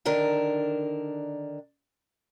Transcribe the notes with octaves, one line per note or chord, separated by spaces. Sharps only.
D3 D#3 D4 A#4